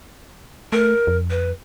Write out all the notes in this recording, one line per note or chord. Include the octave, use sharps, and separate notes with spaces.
A3 A#4
F2
B4